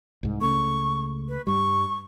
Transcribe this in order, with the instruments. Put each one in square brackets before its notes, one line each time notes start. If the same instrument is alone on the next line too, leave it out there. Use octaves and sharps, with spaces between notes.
[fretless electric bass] C2 G#2
[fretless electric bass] C#2 C#3 A3 [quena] C#6
[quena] B4
[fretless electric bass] G2 G3 [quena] C#6